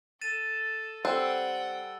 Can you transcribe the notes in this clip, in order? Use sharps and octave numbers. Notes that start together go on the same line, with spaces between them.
A4 A6 D#7 E7
G3 C4 A4 F#5 G5 F#6